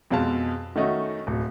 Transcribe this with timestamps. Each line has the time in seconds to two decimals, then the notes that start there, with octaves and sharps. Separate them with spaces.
0.10 F2 B2 G#3 F5 A5
0.76 D#3 A3 C#4 D#4 F#4
1.27 D1